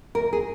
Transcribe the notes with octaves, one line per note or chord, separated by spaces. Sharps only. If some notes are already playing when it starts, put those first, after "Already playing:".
D#2 A#4
G#4